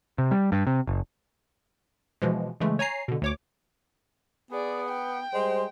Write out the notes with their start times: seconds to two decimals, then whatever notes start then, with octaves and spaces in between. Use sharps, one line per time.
0.18 C3
0.31 G3
0.52 G2
0.67 C3
0.88 F#1
2.22 B2 E3 F3 G#3
2.60 C#3 E3 G#3 A3
2.79 C#5 G#5 A#5 C7
3.08 B2 D3
3.22 D2 C#5 D6
4.51 B3 G#4 D5
4.89 G5
5.34 G3 G#3 C5